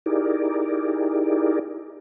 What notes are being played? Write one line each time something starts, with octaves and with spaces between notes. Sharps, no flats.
D#4 E4 G4 G#4 A#4 D5